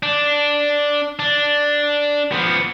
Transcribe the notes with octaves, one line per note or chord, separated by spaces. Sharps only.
D4
D4
F3 B3